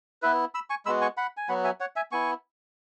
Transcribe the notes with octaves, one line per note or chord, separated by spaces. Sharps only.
B3 E4 B4 E5
B5 E6
G#5 C#6
G#3 B3 F#4 B5 E6
G#5 C#6
F#5 B5
G#5
F#3 B3 F#4 F#5 B5
E5 G#5
C#5 F#5
E5 G#5
B3 E4 G#5 C#6